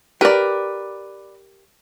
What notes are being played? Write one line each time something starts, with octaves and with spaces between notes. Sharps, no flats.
G4 A#4 B4 D5